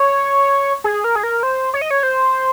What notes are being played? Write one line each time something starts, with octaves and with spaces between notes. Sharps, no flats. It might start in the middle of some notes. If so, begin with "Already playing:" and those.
Already playing: C#5
G#4
A#4
G#4
A#4
C5
C#5
D#5
C#5
C5